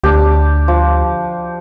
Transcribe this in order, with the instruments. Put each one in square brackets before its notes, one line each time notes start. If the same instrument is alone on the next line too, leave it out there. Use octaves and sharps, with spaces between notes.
[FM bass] D2 [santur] D4 G4
[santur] F3